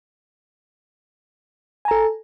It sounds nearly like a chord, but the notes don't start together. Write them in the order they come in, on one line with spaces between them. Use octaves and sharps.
G#5 A#5 A4